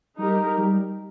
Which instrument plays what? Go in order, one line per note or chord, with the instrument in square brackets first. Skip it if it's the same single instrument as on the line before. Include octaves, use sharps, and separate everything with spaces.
[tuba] G3 [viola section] D#4 G4 A#4
[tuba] G3